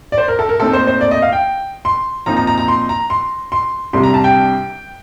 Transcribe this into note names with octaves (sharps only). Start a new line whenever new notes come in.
D5
C5
A#4
A4
A#4
A#2 A3 C4 D#4 A4
C5
C5
D5
D#5
F5
G5
C6
A#2 F3 C4 D#4 A#5
A#5
A#5
A#5
C6
A#5
C6
C6
C2 C3 G3 D4 C6
A#5
A5
G5